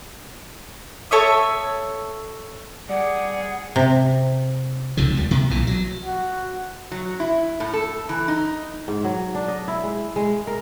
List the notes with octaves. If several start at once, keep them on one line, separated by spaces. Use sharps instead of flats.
A4 C#5 E5 D#6
G3 G#4 D5 F#5
C3
C#2 C3 D#3 F3
D#2 G3
C3 B3
B1 A#2 E3
F#3
F#4
F#3
E4
A2
A4
E3
D#4
G#2
F#3
D4
D#5
E4
G#3
G#3
A#4